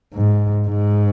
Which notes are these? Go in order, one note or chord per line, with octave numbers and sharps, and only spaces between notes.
G#2
G#2